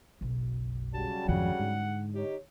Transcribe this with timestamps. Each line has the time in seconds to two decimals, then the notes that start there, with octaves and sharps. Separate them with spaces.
0.21 F#1 B1
0.94 C#3 F#3 G3 A5
1.28 G#1 F2 D3 F3 F#5
1.59 G#2
2.15 D#4 G4 C#5